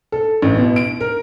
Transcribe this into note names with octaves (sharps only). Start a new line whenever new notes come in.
A4
A1
B2
D7
A#4